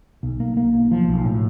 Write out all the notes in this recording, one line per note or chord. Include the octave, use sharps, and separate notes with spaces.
B1
A#3
A#3
B1
F3
B1
A2